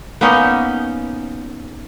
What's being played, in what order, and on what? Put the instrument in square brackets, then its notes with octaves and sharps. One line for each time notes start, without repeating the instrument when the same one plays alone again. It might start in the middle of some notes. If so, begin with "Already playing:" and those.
[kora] A#3 B3 C#4 D#4